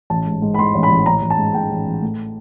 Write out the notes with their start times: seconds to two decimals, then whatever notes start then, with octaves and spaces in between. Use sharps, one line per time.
0.10 A1 A5
0.26 G#2
0.42 G#2
0.54 B5
0.59 G#2 C6
0.75 A1
0.83 B5
0.91 A1
1.06 A1 A#5
1.22 A1
1.30 A5
1.38 G#2
1.54 G#2 G5
1.71 A1
1.86 A1
2.02 A2